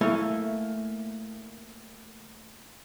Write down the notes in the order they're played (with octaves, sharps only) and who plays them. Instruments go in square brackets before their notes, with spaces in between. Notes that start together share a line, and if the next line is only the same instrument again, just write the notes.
[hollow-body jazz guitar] A3 A#3 E4 A4 G#5